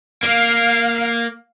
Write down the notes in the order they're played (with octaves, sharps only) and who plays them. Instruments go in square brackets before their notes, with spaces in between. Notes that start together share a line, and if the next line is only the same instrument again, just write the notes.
[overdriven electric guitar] A#3 [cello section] F5